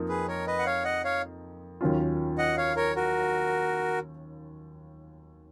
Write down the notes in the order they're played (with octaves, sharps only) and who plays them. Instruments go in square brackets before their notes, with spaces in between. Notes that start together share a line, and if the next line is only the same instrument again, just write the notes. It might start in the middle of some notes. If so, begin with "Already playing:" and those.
Already playing: [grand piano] F2 F3 A#3 D#4
[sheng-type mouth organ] G#4 B4
A#4 C#5
B4 D#5
F#5
C#5 F5
D#5 F#5
C#5 F5
[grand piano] D#2 D#3 F#3 C#4 F4
[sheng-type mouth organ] D#5 F#5
C#5 F5
A#4 C#5
F#4 A#4